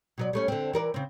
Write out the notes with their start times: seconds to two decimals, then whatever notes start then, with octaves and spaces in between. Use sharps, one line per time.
0.18 B2 F#3 D5
0.33 G3 A3 C#4
0.48 D3 C4
0.74 E3 A#4 D5
0.94 C#3 C4